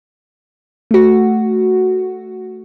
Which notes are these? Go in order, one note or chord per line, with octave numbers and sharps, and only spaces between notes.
A3 F#4